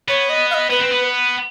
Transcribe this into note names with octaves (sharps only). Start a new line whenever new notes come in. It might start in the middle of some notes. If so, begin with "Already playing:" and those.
B3 C#5
D#5
F5
D#5
B3 B4
C4
B3